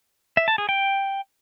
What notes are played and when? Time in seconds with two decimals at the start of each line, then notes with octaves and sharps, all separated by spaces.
0.37 E5
0.48 A5
0.58 G#4
0.69 G5